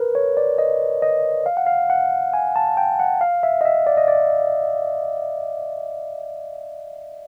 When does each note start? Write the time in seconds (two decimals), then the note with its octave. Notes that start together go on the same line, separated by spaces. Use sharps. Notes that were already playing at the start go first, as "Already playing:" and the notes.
Already playing: A#4 B4
0.15 C#5
0.37 D5
0.58 D#5
1.02 D#5
1.46 F5
1.57 F#5
1.67 F5
1.90 F#5
2.34 G#5
2.56 A5
2.77 G5
3.00 F#5
3.21 F5
3.43 E5
3.61 D#5
3.65 E5
3.87 D5
3.97 D#5
4.08 D5